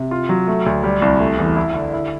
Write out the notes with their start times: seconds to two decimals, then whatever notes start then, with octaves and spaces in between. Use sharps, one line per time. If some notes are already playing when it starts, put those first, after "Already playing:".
Already playing: C3
0.11 F4
0.29 F#3
0.47 A3
0.66 D2
0.84 G3
1.02 C2
1.20 A3
1.38 E2
1.56 E4
1.74 D3
1.93 E4